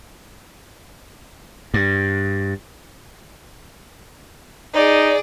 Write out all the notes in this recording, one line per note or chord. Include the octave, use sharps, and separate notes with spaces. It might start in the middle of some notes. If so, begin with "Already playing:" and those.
G2
D#4 G#4 D5